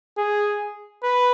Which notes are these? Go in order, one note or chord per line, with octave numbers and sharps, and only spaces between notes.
G#4
B4